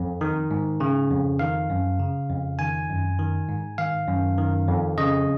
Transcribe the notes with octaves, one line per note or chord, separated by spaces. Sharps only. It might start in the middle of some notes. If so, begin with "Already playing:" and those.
Already playing: F2
D#3
G#2
C#3
F2
D#3 F5
F#2
C#3
F2
D#3 G#5
F#2
D#3
G#2
D#3 F5
F#2
D#3
F2
C#3 D#5